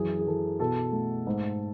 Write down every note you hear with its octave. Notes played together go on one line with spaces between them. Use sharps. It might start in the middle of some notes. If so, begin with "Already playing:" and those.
Already playing: F#2 E3 G#4
G#4
E3 A4
B2 A4
A3
G#2